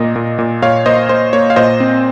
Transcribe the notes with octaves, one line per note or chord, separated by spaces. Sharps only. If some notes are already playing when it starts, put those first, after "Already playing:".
Already playing: A#2 A#3 D#5
A#2
A#2
A#2 C#5 F5
A#3 C5 D#5
A#3 C5
A#3 C#5
F5
A#2 C5 D#5
C4